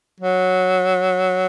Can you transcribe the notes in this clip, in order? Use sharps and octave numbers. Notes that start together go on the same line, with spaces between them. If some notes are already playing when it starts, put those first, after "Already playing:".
F#3